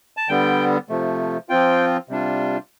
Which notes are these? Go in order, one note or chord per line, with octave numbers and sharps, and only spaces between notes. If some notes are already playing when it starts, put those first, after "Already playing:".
A5
D3 G3 B3 G5
C3 F3 A3
F3 C4 F4 G5
C3 G3 D4 F4